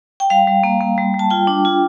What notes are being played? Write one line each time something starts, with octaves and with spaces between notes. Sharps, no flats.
G5
G3 F5
G3
A#3
A#3
G3
G3
A5
F4 G5
D4
F4